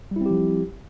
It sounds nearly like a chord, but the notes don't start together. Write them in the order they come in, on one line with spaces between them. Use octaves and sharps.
G3 E4 C4 G4 F3